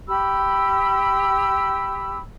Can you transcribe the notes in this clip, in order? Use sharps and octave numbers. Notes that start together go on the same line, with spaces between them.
G4 B5 E6